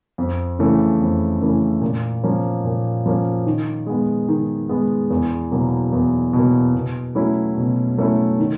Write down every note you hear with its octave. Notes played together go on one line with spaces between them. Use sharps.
F2
C#3 E3 A3 C#4
F2
C#3 E3 A3 C#4
A#2
F3 A#3 C#4
A#2
F3 A#3 C#4
D#3
G#3 B3
D#3
G#3 B3
E2
B2 F#3 A#3
E2
B2 F#3 A#3
B2
F#3 A3 C#4 E4
B2
F#3 A3 C#4 E4
D#3